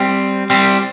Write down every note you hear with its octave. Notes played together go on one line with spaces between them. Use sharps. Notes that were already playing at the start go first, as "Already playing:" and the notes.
Already playing: G3 C4
G3 C4